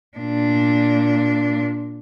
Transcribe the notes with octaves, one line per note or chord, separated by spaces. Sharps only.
A#2 D4